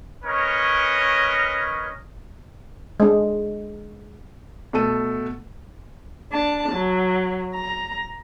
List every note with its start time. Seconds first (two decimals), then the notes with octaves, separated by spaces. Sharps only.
0.25 C#4 A#4 B4 C#5 D#5
3.00 G#3 D4
4.73 B2 A3 A4 D#7
6.32 D4 A5
6.72 F#3
7.55 A#5